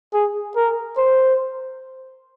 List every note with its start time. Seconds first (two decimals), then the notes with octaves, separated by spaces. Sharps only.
0.14 G#4
0.56 A#4
0.98 C5